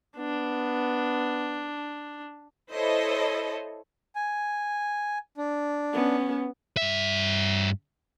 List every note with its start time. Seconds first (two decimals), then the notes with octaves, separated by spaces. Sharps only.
0.17 B3 D4
2.71 E4 A4 C5 C#5 D#5
4.15 G#5
5.37 D4
5.93 B3 C#4
6.77 G2 E5